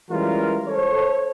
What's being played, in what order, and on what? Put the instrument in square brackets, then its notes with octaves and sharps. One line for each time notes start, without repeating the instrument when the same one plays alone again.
[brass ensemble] E3 G3 G#3 C#4 F4 A#4
A4 C5 C#5